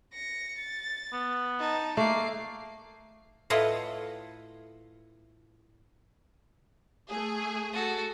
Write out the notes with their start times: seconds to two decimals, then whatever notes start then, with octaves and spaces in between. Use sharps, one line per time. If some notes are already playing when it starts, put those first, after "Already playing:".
0.13 A#6 C#7
0.58 A6
1.13 B3
1.59 D#4 A5
1.97 A3 A#3 D6 C7
3.50 A2 E4 F4 B4 D#5 F#5
7.10 A3 G#4
7.73 F#4 A4